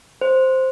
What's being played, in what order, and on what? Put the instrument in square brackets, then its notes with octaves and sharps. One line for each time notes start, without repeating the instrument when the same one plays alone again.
[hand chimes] C5